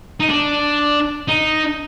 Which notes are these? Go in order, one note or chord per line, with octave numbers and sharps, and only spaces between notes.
D#4
D4
D#4